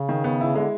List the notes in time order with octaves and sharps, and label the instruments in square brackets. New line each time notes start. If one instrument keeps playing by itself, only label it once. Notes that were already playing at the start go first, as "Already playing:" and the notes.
Already playing: [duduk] C#3
[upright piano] D#3
B3
E4
[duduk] D3 [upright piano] G#3